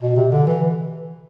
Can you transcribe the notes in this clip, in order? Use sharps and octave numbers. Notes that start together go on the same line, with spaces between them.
B2
C3
D3
E3